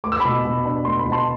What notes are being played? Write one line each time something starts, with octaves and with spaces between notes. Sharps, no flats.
A3 D6
E6
B2 B5 D6
B2
D4
A3 C6
B5
B2
A5 C6